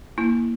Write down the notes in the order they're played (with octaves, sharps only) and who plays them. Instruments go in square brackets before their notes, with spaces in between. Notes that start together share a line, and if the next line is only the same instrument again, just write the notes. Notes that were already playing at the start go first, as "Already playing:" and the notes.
[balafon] A#3 E4